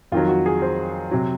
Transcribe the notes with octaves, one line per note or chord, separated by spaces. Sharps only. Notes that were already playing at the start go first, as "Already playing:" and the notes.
F2 D#3 F#3 F4
F#4
G#4
C5
C3 F#3